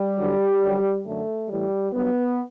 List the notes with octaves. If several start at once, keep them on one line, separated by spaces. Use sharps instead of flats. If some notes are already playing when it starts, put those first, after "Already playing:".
Already playing: G3
E2 D3 F#3
F#2 D3 F#3
F#2 D3 F#3 A3
A2 E3 G3
G2 F#3 B3